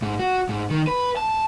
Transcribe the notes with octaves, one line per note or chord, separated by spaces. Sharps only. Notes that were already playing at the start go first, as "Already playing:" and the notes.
G#2
F#4
G#2
D#3
B4
A5